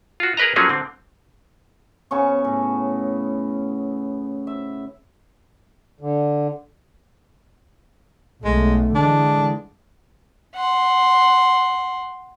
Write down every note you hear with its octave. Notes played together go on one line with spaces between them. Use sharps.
F4 F#4
G#4 A#4 B4 D#5 A#5
F3 F#3 A#3 C#4 G#4 A4
D3 C4
C#3 B3 C#4 C#6
A2
E5
D3
B1 G#3 A3
D3 E3 G#3 D4
F#5 C6